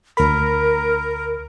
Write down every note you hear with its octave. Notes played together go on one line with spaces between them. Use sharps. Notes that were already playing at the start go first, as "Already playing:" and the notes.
D2 A#4 B5